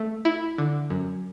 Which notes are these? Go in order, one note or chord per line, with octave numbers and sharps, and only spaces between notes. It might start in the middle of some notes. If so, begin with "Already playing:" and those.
Already playing: A3
E4
D3
F#2